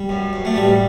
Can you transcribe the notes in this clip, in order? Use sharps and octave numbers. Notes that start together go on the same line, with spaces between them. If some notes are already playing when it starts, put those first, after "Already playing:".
Already playing: G3
F#2
F#2
A3
A1 G3